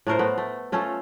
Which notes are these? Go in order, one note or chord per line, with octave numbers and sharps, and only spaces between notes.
A2 A3 A#4 C5
A3 B3
A3
A3 C#4 F4 A4